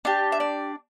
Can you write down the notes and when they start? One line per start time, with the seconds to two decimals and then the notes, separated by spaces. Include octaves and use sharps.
0.05 D4 G4 A5
0.32 E5
0.40 D5